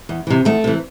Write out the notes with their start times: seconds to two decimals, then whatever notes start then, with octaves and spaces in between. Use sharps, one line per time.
0.09 E2
0.27 C3 E3
0.45 E2 A3
0.64 C3 E3